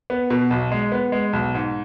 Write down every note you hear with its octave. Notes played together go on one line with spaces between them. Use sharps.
B3
B2
B1
G#3
B3
G#3
B1
G#2